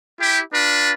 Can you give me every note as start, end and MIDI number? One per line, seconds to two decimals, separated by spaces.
0.20 0.40 64
0.20 0.40 67
0.53 0.92 62
0.53 0.92 65
0.53 0.92 71